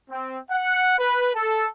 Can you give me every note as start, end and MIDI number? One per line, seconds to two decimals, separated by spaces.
0.11 0.39 60
0.51 0.97 78
0.98 1.31 71
1.35 1.66 69